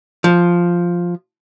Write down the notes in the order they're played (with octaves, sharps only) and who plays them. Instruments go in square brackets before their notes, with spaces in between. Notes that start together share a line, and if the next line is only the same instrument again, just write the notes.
[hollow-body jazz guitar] F3